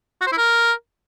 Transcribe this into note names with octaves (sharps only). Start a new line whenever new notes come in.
F#4
C5
E4
A#4